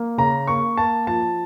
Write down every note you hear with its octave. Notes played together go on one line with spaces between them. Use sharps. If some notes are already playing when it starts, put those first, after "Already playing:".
Already playing: A#3
C#3 A#5
A#3 C#6
A#3 A5
F3 A5